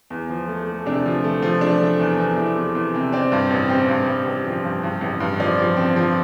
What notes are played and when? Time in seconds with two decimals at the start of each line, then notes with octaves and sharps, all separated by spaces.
0.10 E2
0.29 F3
0.48 A3
0.68 A3
0.86 C3 D4
1.06 F3
1.24 A3
1.42 F3
1.61 F3 D4
1.81 A3
2.00 E2
2.18 E2
2.37 E2 E4
2.56 E2
2.75 E2
2.94 C3
3.12 C4 D5
3.32 G2
3.50 A1
3.69 C4
3.89 G2
4.08 G2
4.27 A1
4.45 F3
4.64 G2
4.83 G2
5.01 A1
5.20 G2
5.40 F3 D5
5.59 F3
5.76 C4
5.96 F3